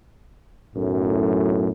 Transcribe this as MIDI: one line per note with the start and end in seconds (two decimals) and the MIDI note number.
0.76 1.68 35
0.76 1.68 42
0.76 1.68 45